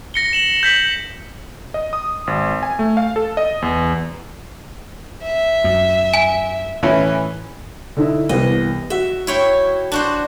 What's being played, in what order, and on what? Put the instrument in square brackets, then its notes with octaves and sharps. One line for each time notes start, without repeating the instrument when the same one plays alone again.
[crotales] A#6 C#7 G7
E7 F#7
G6 B6 F#7
[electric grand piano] D#5
D#6
G#1
G#5
A3
F5
A4
D#5
E2
[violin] E5
[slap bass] F#2
[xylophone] G#5
[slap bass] A2 [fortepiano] E3 C#4 E4
[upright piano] D3 D#4 E4
[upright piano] C2 E3 B3 [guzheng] D#5
[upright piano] F#4 [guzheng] E5
[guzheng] E4 C#5 G5
D4 F#4 C5